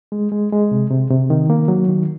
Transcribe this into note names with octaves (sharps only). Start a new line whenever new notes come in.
G#3
G#3
G#3
C3
C3
C3
D#3
A#3
F#3
D#3